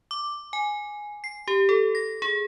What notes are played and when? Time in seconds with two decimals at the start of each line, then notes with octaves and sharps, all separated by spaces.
0.11 D6
0.53 G#5
1.24 C7
1.48 G4
1.69 A4
1.95 A#6
2.22 G#4